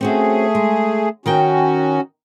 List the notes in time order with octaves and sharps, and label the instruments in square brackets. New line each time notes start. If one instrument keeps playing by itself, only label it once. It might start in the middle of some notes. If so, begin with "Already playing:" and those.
[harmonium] A3 G#4 [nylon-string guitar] C4 C#4 F#4
[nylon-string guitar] G#3
[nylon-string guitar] D#3 A#4 G5 [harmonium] C#4 F#4